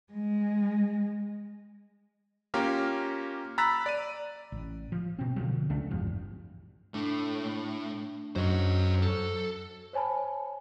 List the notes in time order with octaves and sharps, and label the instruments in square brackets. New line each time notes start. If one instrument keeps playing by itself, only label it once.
[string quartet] G#3
[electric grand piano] A#3 C#4 F4 G4 A#4
A#5 B5 E6 F#6 A6 B6
D5 D#7
[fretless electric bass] A1
F3
B2 C4
B2 D3 F3 F#3
C#2 A3 D4
G#1 E2 G2 F3
[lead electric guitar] A2 A3 [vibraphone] D4
[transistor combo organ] F#2 [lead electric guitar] C5 D#5
[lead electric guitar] A4
[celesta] C5 C#5 G#5 A5 B5